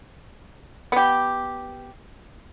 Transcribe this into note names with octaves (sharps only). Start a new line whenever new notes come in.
B3 G4